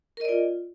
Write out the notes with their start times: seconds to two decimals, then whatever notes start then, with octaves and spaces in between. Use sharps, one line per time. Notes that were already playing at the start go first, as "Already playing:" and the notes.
0.17 A#4
0.21 D#5
0.25 D5
0.29 F4